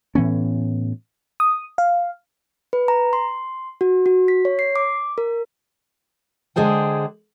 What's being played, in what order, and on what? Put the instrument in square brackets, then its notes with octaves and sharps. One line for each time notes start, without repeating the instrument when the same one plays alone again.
[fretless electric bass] A2 E3 B3 C#4
[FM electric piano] D#6
F5
[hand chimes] B4
A#5
C6
F#4
F#4
B6
C#5
C7
D6
A#4
[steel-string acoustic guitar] D3 G#3 G#4 C5 G5